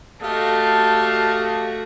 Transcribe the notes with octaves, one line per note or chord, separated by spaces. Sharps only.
A3 F#4 G4 D#5 F5 A5